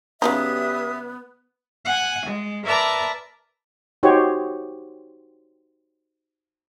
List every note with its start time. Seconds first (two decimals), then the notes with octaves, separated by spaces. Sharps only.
0.22 C#3 F#3 G3 B3 D#4 G4 E5 D#6
1.85 F#5 G#5
2.27 G#3
2.66 A#4 B4 D5 E5 A5 A#5
4.03 D#4 F#4 G4 C5 C#5